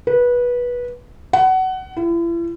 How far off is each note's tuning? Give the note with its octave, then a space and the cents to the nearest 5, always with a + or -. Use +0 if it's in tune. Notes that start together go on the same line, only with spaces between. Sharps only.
B4 -20
F#5 +20
E4 +40